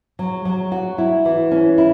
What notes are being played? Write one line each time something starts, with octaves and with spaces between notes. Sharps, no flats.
F#3
F#3
F#4
E4
E3
C#4
E4